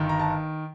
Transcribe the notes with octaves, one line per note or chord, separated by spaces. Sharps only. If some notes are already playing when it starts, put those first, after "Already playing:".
Already playing: G1 D#3
A#5
A5